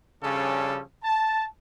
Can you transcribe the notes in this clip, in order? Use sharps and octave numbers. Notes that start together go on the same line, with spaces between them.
C#3 F3 G3 C#4 D4 A4
A5